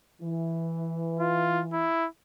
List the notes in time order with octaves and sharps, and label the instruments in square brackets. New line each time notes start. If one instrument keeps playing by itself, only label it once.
[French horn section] E3
[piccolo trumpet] F4
E4